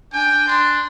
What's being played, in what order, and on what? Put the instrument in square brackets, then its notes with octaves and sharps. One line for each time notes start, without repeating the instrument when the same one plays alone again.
[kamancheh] D4 G#5 [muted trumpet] G5
[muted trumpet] D4 [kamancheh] C6